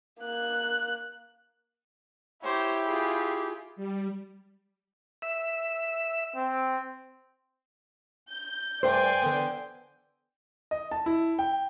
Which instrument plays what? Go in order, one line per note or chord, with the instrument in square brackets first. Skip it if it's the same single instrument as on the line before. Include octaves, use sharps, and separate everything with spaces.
[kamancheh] A#3 F#6
[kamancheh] E4 G4 [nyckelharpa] C5 C#5
[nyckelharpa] F4 G#4
[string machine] G3
[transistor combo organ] E5
[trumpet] C4
[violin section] G6
[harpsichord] G2 A3 [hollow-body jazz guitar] C5 [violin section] D5 G#5 C6 [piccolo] G5
[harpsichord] D3 B3
[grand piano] D#5
A5
E4
G5